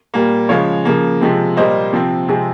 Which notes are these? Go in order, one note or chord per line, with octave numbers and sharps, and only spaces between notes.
A#2 G3 A#3
C#3 F3 G#3 C#5 F5
C#3 F3 A#3
C3 F3 G#3 C4
A#2 G3 A#3 C5 D#5
C3 F3 C4
C3 F3 G#3 C4 G#4